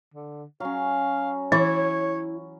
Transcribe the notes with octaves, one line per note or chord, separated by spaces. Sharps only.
D3
F#3 C#4 F5
E3 E4 C#5